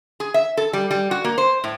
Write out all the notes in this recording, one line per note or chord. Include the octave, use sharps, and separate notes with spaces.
G#4
E5
A4
G3
G3
F#4
A#3
C5
A2